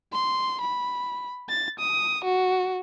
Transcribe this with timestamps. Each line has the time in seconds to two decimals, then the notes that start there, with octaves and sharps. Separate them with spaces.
0.13 C6
0.61 B5
1.49 A6
1.79 D#6
2.25 F#4